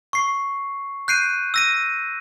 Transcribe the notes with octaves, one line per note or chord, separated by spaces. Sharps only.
C#6 C7
F#6 G6 C7 D7 D#7
E6 A#6 D#7